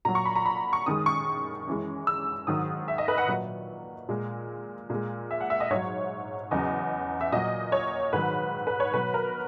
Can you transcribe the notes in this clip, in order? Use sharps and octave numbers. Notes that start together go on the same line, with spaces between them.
A#2 F#3 A#5
C#6
B5
A#5
B5
C#6
F#2 D#3 G#3 D#6
C#6
F#2 E3 G#3
E6
G#2 D#3 F#3 D#6
E5
D#5
B4
F#5
A#2 F#3
A#2 G#3
A#2 G#3
E5
F#5
E5
D#5
G#2 F#3 C#5
E2 C#3 F#3 D#5
E5
A#2 F#3 D#5
C#5
G#2 D#3 F#3 B4
B4
C#5
B2 F#3 B4
A#4